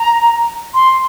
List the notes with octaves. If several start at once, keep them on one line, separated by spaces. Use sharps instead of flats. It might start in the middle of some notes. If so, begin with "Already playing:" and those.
Already playing: A#5
C6